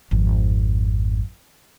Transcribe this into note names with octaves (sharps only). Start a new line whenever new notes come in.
G#1 F2